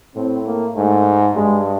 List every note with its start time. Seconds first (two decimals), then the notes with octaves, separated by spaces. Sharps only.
0.15 A2 C4
0.46 A#3
0.75 G#2 A3
1.35 G2 G#3